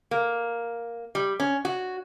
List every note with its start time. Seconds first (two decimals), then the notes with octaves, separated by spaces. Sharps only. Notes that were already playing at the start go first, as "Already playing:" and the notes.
0.11 A#3
1.15 G3
1.40 C#4
1.65 F#4